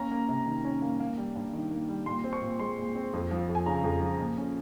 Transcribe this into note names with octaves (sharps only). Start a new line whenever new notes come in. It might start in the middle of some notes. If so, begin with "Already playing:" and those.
Already playing: A#3 C#4 A#5
A#3
C3
D#3
C#4
A#3
A#3
G3
G2
D#3
A#3
G3
A#2 C6
C4
C#6
A#2
G#3 C6
A#2
C4
F2
F3
F2
G#5
C#3 A#5
F2
F3
A#2
C#4